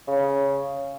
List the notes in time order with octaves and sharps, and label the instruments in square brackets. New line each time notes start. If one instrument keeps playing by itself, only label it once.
[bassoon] C#3